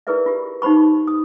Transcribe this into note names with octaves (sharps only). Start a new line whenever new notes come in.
E4 G#4 A#4 B4 D5 E5
F4 G4
D#4 G4 C5 B5 C#6
D#6